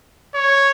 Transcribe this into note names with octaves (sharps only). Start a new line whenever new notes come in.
C#5